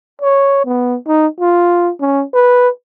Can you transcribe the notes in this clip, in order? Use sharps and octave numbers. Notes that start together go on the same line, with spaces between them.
C#5
B3
D#4
F4
C#4
B4